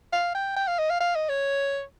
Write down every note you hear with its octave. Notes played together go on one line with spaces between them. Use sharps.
F5
G5
G5
F5
D#5
F5
F5
D#5
C#5